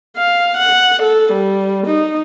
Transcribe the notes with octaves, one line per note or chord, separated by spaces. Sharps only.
F5
F#5
A4
G3
D#4